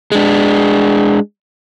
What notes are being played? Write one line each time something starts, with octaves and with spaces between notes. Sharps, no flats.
G#3 D4